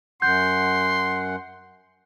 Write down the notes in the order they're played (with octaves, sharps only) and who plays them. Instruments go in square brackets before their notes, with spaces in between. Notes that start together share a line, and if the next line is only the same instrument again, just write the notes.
[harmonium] F#2 F#5 [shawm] C6 [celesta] G6